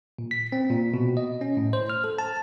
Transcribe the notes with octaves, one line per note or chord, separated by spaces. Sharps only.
A#2
B6
C4
A#2
B2
D#5
C#4
A2
C5
F6
A4
A5